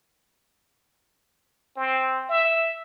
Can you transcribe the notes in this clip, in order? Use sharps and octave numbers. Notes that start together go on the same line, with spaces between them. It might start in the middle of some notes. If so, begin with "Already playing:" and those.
C4
E5